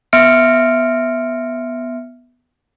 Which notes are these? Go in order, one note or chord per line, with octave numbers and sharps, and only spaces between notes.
B3 E5 C6 F6 C#7 D7